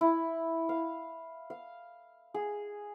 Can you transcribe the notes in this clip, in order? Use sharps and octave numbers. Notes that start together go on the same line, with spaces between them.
E4
F5
F5
G#4